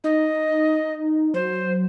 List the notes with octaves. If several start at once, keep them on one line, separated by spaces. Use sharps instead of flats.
D#4 D#5
F#3 C5